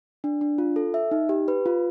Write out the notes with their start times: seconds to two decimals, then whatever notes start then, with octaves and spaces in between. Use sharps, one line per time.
0.24 D4
0.41 D4
0.58 F4
0.76 A4
0.94 E5
1.11 D#4
1.29 G4
1.48 B4
1.66 F4